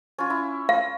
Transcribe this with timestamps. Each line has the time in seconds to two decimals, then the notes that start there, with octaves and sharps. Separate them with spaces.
0.18 C#4 F4
0.30 E4
0.69 F4 F5